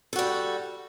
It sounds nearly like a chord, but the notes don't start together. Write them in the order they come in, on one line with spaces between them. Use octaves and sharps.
A4 F#4 G3